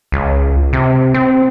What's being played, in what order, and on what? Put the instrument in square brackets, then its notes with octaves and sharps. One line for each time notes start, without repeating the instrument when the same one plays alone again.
[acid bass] C#2
C3
C4